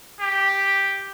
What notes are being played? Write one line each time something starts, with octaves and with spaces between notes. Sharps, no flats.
G4